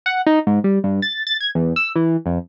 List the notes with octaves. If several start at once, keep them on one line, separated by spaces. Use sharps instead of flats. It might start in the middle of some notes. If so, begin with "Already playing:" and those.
F#5
D#4
G#2
G3
G2
A6
A6
G#6
E2
E6
E3
F2